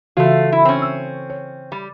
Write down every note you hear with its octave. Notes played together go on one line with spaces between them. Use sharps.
C#3 E3 A3 F4 F#4
E4
C4 C#4
E6
C#5
G3